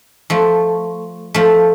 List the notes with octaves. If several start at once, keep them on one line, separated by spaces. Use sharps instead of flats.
F3 A3
F3 A3